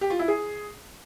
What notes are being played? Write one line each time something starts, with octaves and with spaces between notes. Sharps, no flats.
G4
F4
E4
G#4